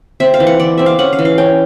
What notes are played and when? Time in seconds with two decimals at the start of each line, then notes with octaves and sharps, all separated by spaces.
0.20 C4 E5
0.34 F5
0.40 E3
0.47 F#5
0.60 E3 D5
0.78 C4 E5
0.86 F5
0.99 C#4 F#5
1.13 F5
1.19 E3
1.25 F5
1.38 C#4 G5